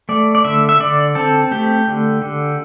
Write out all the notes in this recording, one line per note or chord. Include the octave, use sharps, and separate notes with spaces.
A3 D5
D5
D3 E5
E5
D3 D5
C4 A4
A3 G4
D3
D3